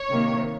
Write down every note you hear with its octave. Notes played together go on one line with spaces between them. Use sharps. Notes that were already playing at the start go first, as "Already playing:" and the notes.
Already playing: C#5
C3 D#3 A#3